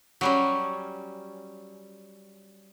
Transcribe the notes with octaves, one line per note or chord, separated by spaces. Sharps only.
F#3 G3 C#4